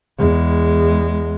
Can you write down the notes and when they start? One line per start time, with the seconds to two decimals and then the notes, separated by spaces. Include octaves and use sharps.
0.18 E2 G#3